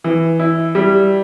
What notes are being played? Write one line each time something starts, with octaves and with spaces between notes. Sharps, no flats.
E3
E4
G3